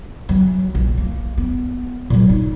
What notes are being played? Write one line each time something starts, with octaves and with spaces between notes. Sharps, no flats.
E3 F#3
A#1
A#3
B3
A#2 F#3
D#4